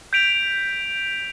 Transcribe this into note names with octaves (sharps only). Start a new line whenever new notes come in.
G6 B6 D7 F7